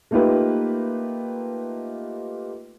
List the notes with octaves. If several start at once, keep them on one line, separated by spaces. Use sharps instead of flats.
A3 A#3 D#4 F4 G4 B4